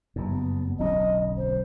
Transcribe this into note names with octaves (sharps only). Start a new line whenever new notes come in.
F#1 G2
B3
D1 B1 C#4 D#5
C5